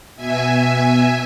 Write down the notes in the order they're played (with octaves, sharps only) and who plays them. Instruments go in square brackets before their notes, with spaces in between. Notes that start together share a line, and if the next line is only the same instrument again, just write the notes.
[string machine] B2 E5 G#5